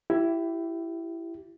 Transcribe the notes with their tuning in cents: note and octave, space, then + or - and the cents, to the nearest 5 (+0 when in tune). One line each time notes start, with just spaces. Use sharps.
E4 +15 G4 -20